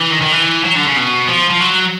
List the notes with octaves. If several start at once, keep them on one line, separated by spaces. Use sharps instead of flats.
E3
D#3
D#3
E3
F#3
D3
C#3
B2
F3
F3
F#3